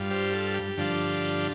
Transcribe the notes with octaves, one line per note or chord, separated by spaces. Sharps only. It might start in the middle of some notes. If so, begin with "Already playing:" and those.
Already playing: G2 G3 F4
G4 C5
F4 A4
G4
G2 D3 F3 D4 F4